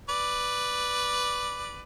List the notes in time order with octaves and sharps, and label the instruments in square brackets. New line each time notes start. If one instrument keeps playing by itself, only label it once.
[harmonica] B4 D5